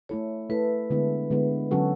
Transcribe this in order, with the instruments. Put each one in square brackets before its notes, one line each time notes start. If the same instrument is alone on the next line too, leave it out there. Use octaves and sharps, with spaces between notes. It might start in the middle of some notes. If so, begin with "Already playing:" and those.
[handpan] A3 E4 A4 [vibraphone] C#5
[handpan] A3 E4 A4 [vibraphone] B4
[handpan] D3 G#3 B3 E4
D3 G#3 B3 E4
D3 F#3 C#4 F#4 A4